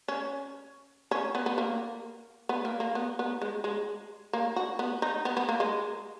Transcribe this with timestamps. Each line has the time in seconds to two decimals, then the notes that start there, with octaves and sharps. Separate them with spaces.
0.08 C#4
1.11 C#4
1.35 B3
1.46 B3
1.58 A#3
2.49 B3
2.65 A#3
2.80 A#3
2.95 B3
3.19 B3
3.41 G#3
3.64 G#3
4.33 A#3
4.56 F#4
4.79 B3
5.02 D#4
5.25 B3
5.37 B3
5.49 A#3
5.60 G#3